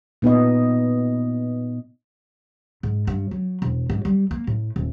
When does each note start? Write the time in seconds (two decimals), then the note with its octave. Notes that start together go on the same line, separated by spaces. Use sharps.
0.22 A#2 B3 D#4 D#5
2.83 G#2
3.07 G2
3.31 F#3
3.62 E1
3.90 G#2
4.05 G3
4.31 A#3
4.47 A2
4.76 D#1